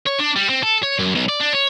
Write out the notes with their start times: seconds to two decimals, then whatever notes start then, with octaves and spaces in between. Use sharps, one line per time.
0.06 C#5
0.19 D4
0.36 G3
0.49 C4
0.63 A4
0.83 C#5
0.99 F#2
1.15 B1
1.29 D5
1.41 D4
1.53 C#5